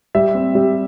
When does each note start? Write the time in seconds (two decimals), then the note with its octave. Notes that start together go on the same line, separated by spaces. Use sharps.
0.15 G3 E5
0.35 C4
0.55 G3